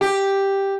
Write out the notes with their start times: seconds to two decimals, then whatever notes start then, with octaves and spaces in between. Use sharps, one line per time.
0.01 G4